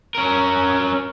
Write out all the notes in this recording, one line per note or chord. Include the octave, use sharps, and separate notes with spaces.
C#4 A#4